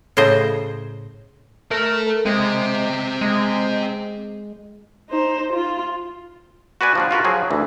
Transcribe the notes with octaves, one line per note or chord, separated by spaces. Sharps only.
A2 C#3 C5 D#5
A4 A#4 E5
G#3 C4 E5
G#3
D#4 C5
F4
F#4 B4 D5 G#5
F3 G3 D4
F4 F#4 A#4 B4
F3 F#3 G#4
D2 E3